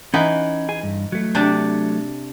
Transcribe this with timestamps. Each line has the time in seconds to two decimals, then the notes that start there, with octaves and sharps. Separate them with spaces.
0.14 E3 C#4 D#4 F#5
0.69 G#4 G#5
0.83 G2
1.12 F#3 A3
1.35 C3 D4